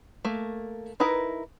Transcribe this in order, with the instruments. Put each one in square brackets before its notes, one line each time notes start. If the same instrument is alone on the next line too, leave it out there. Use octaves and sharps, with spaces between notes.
[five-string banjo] A3 A#3
D#4 E4 A#4 B4